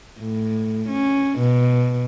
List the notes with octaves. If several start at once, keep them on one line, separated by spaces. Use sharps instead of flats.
A2
C#4
B2